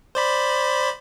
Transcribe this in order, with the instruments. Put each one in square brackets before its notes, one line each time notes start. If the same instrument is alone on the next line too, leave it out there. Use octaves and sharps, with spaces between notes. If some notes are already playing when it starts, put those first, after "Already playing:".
[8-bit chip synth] C5 D5 B5